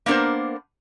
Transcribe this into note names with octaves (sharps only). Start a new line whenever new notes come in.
A#3 B3 D4 A#4 C5